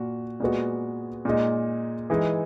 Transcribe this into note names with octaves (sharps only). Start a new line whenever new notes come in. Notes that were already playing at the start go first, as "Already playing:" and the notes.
Already playing: A#2 F#4
A#2 G#3 B3 F#4
A#2 G#3 D#4
E3 G#3 D#4